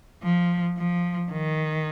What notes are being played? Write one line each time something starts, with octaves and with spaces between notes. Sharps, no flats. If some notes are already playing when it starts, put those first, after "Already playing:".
F3
F3
D#3